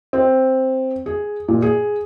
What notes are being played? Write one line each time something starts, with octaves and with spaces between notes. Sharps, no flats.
C4
G#4
A#2
G#4